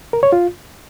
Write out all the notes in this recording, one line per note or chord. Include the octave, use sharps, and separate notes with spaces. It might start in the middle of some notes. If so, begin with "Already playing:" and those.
A#4
C#5
F4